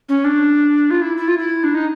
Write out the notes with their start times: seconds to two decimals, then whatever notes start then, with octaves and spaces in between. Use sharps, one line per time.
0.09 C#4
0.24 D4
0.91 F4
1.02 E4
1.17 E4
1.28 F4
1.38 E4
1.64 D4
1.75 D#4